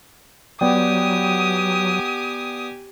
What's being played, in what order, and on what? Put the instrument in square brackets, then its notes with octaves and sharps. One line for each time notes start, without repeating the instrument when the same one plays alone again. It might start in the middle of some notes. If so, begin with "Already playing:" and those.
[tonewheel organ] F#3 [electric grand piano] B3 D5 G5 [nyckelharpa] G4 G#5 [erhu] D#6